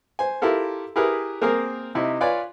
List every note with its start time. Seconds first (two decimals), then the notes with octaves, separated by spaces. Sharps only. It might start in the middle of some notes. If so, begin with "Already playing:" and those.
0.19 C5 G#5
0.42 E4 F4 G4 A4 A#4
0.96 E4 G4 G#4 A#4 B4
1.42 A#3 C4 G#4 A#4
1.95 C3 D#4 E4
2.21 F4 B4 C#5 D5 G#5